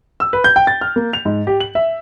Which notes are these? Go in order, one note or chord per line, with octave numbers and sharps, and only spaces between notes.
E6
B4
G6
G5
A6
F6
A#3
F7
G#2
G4
F#7
E5